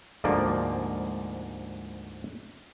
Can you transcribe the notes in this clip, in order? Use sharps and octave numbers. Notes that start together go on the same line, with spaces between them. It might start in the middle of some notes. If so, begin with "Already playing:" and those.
D2 G#2 F3 A#3 D5